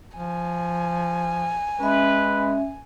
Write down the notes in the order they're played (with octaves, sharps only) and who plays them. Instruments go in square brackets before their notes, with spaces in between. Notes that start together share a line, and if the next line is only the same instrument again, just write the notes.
[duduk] F3 [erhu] G#5
[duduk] G#3 [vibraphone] C#4 E5 [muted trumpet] B4